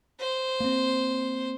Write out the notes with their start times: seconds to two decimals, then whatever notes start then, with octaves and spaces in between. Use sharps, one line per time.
0.20 C5
0.60 A#3 C4